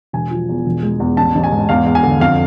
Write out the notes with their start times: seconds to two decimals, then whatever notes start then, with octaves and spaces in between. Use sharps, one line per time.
0.13 E1 G#5
0.31 F3
0.49 E2
0.66 E1
0.83 G#3
1.00 E2
1.17 A1 A5
1.35 A1
1.44 G#5
1.52 G#2
1.69 E2 F5
1.86 E2
1.95 G#5
2.03 D3
2.20 F2 F5